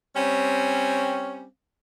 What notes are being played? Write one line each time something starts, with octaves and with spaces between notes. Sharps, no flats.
G3 C4 C#4